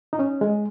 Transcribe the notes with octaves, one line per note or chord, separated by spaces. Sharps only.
D#4
C#4
G#3